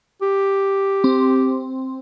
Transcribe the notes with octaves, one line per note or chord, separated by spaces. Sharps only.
G4
C4